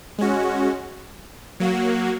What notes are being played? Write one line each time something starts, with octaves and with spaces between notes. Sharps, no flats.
G#3 C#4 F#4
F#3 A#3 F#4